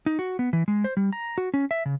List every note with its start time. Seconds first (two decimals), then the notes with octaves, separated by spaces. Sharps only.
0.06 D#4
0.19 F#4
0.39 B3
0.53 E3
0.68 G#3
0.84 C5
0.97 G3
1.13 A#5
1.38 F#4
1.54 C#4
1.71 E5
1.86 C#3